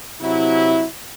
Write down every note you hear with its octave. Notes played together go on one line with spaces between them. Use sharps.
C3 F#3 E4